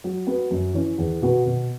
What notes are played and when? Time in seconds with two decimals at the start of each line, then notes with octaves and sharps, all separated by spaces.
0.04 F#3
0.27 B3 F#4 B4
0.51 F#2
0.74 E3 C#4
0.98 E2
1.22 B2 B3 F#4 B4
1.46 B2